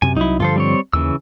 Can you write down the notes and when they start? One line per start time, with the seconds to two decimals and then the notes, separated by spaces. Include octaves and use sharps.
0.02 F#2 C3 G#5
0.17 C2 F#3 D#4 E4
0.40 G2 D3 F3 F4 A4 C5
0.56 G3 C4 C#5
0.93 D#2 C#3 E3 E6